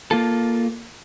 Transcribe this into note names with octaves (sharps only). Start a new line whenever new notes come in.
A#3 F4 A4